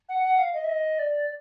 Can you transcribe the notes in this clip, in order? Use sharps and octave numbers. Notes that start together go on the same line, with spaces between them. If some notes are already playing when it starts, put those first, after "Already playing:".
F#5
F#5
F5
D#5
E5
D#5
D5